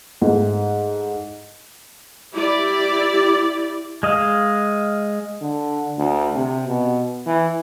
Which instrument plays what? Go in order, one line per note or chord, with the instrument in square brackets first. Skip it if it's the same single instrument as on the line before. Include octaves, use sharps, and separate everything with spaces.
[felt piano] G#2 A3
[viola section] E4 G4 D5
[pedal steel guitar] G#3 D#5 F5
[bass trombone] D3
D2
C3
B2
E3